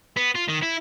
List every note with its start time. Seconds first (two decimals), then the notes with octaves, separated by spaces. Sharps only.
0.17 B3
0.36 F4
0.49 D#3
0.63 E4